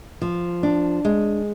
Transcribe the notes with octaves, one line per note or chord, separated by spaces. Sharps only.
F3
D4
G#3